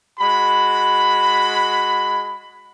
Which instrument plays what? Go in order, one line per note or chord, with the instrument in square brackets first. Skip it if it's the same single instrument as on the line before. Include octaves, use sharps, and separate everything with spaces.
[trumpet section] G#3 F#4 B5